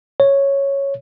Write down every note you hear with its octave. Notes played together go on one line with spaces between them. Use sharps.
C#5